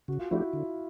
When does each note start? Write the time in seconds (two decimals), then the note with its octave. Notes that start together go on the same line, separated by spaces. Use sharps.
0.08 C#3 F#4
0.19 F4
0.31 F3 A3 D4 E4 F#4 G4
0.53 D3